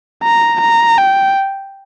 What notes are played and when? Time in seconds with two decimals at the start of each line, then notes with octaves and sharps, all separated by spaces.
0.23 A#5
0.61 A#5
0.98 G5